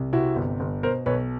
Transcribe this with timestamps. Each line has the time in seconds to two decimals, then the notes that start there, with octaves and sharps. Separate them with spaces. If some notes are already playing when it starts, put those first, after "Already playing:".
Already playing: C2
0.12 C3 E4 F#4
0.36 G1
0.60 G1
0.83 B2 A#4 C5
1.06 B1 B4 C#5